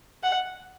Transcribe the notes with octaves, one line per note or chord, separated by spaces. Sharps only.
F#5